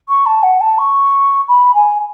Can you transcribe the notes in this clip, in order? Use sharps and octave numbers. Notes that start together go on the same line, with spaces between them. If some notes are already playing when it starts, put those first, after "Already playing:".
C#6
A5
F#5
A5
C#6
B5
G#5